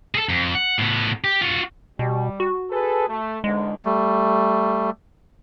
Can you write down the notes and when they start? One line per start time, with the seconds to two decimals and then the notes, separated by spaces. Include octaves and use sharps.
0.15 G#4 A4
0.29 F2
0.55 F#5
0.79 A2 B3
1.24 G4
1.41 F4 F#4
1.99 B2 G3
2.40 F#4
2.71 G#4 A4 B4
3.08 A3
3.44 E2 G#2 D3 G#3
3.85 G3 A3